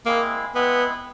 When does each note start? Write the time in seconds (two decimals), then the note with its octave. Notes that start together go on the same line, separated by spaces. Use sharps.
0.06 G#3 A#3 C4 E4 G#4
0.54 G#3 B3 C4 E4 G#4